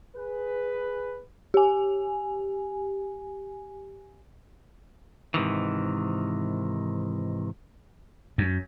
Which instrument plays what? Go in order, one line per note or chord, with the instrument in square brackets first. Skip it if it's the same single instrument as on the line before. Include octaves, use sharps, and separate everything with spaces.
[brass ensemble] G#4 B4
[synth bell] G4 G#5
[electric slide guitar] G#2 C3 D#3 E3
[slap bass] F#2